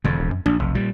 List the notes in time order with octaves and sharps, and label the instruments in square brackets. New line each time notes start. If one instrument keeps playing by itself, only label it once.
[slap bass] E1 F2 [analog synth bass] D3
[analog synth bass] D1
F#2
[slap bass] A#1 [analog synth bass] D4
[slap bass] F1 [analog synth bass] B1
[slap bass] A#2 G3